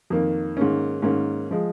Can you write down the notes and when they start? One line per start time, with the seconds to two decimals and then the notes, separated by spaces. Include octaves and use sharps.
0.10 F2 D#3 A#3
0.57 G#2 D#3 A#3 C#4
1.02 G#2 D#3 A#3 C#4
1.51 F3 G#3